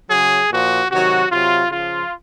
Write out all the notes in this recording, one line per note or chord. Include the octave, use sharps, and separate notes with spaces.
C#3 F#3 G#4
A#2 F3 F#4
C3 D#3 F#3 F#4
C3 F#3 F4
C#3 F3 F4